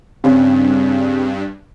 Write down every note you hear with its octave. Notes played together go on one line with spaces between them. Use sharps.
G2 C#3 C4